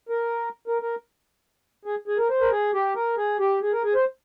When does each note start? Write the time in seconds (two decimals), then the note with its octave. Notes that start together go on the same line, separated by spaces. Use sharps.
0.09 A#4
0.68 A#4
0.82 A#4
1.85 G#4
2.08 G#4
2.18 A#4
2.29 C5
2.41 A#4
2.51 G#4
2.74 G4
2.96 A#4
3.17 G#4
3.39 G4
3.62 G#4
3.73 A#4
3.84 G#4
3.95 C5